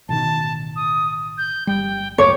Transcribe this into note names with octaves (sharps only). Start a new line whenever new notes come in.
A1 B2 D#3 A5
D#6
G6
G1 G3 G5
C#2 F#2 A2 C#5 D6